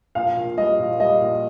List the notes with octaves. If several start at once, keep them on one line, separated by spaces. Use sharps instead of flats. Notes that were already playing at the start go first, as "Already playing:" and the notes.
A#1 F5
A#2
G3 D#5
A#1
G3 D#5
A#1